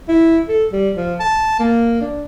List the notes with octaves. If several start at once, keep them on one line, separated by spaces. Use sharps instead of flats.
E4
A4
G3
F3
A5
A#3
D4